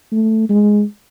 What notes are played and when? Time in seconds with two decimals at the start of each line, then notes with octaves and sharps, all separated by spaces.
0.12 A3
0.49 G#3